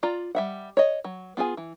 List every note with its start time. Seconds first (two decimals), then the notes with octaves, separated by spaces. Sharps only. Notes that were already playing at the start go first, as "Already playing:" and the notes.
0.03 F4 D5 A#5
0.35 G3 E5 F#5
0.77 C#5 D#5
1.04 F#3
1.37 B3 F4 G#4 G#5
1.57 E3